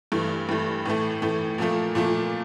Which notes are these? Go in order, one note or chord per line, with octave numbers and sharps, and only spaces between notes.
G2 E3 A3
G2 E3 A3
A2 E3 A3
A2 E3 A3
A#2 F3 A3
A#2 F3 A3